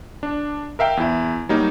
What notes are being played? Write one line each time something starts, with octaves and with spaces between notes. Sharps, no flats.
D4
A#4 E5 F5 G5
E2 E4
F#3 G3 A#3 D#4